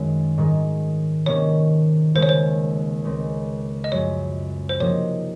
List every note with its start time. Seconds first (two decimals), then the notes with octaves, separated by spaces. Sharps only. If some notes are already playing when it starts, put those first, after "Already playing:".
Already playing: F#2 D#3 G#3 C4 D#4
0.38 G#2 D#3 G#3
1.26 C3 D#3 A#3 C#4 C#5
2.15 D#2 C#3 G#3 C5
2.23 C#5
2.29 C5
3.04 C#2 C#3 G#3 C4
3.84 D#5
3.92 F#2 F3 G#3 C#5
4.69 C5
4.80 C3 F3 A#3 D#4 C#5